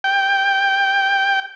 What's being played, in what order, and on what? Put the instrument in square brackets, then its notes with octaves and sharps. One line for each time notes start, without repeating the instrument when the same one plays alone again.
[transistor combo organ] G5